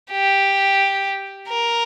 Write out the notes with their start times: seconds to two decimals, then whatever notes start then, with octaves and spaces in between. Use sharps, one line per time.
0.12 G4
1.49 A#4